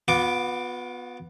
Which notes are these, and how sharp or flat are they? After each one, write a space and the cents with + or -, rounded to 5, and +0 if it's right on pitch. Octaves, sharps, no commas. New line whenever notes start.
B3 +0 F4 +45 D6 +0